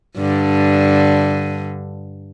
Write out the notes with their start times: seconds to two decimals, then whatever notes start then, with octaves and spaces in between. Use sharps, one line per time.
0.17 G2 D3